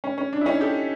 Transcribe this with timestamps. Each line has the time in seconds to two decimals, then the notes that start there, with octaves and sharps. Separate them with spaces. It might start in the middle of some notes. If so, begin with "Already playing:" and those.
0.04 C#4
0.18 C#4
0.33 D4
0.41 E4
0.46 C#4 D#4
0.60 G4 A4